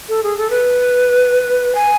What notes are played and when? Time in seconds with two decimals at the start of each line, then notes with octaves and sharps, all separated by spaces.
0.09 A4
0.23 G#4
0.38 A4
0.50 B4
1.75 G#5